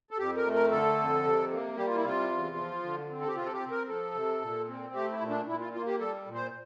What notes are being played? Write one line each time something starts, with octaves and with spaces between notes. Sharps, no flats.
A4
F2 G4
A#4
A3
A#4
D3 A4
F2
C3
A#3
G3 G4
F4
E4
C3 F4
E2
F3
D3
C4
A4
G4
C3 F4
A4
G4
C4
A#4
F3 A4
C3
A#2
C4
A3 G4
E4
A#2
D4
A#2 E4
F4
A#3 F4
G4
G3 A4
A#2
C5